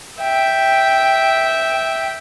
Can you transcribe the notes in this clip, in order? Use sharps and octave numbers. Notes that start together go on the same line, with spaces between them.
E5 G5